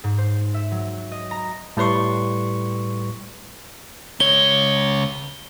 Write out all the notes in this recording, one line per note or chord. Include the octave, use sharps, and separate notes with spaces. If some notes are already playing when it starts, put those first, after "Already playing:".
G#2
C5
E5
F#3
D#5
A#5
A2 G3 B4 C6 C#6
C#2 C#5 G7